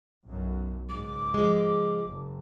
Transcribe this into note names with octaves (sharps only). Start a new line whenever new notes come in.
B1 F#2
C#2 G#2 D6
F3 G#3
F#1